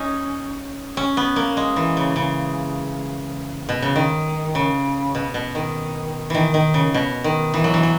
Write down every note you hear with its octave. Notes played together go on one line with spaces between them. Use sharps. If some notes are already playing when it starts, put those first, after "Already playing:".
Already playing: C#4 D#4
C#4
B3
A#3
G#3
E3
C#3
C#3
B2
C#3
D#3
C#3
B2
B2
D#3
D#3 E3
D#3
C#3
B2
D#3
E3
F#3
E3
F#3